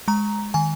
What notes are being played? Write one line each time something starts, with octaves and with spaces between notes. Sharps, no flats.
G#3 A#5
D#3 G#5